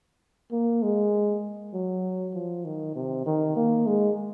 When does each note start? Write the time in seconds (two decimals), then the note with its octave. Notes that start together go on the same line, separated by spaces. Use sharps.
0.52 A#3
0.83 G#3
1.73 F#3
2.35 F3
2.65 D#3
2.96 C3
3.26 D#3
3.56 A#3
3.87 G#3